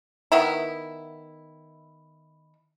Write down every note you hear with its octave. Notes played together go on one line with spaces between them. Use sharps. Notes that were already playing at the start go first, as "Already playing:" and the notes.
D#3 B3 E4